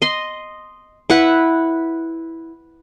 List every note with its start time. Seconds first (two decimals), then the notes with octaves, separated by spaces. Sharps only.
0.02 D#5 C6
1.10 E4 B4 F#5